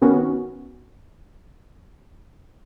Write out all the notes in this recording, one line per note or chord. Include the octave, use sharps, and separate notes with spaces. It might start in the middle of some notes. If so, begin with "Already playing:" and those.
C3 D#3 B3 C#4 F#4